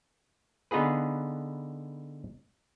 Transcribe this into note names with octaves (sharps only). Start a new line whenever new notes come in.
D3 B3 D#4 F4 G#4 B4